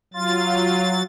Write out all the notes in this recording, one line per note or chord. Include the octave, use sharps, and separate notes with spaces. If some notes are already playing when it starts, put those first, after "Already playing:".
F#3 F4 A6